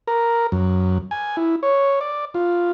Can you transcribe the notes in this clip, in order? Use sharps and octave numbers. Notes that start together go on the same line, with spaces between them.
A#4
F#2
G#5
E4
C#5
D5
F4